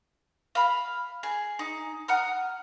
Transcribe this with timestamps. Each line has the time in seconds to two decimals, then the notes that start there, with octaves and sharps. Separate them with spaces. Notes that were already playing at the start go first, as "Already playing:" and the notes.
0.55 F5 B5
1.23 G#4
1.59 D#4
2.08 F#5 A#5 D#6 F6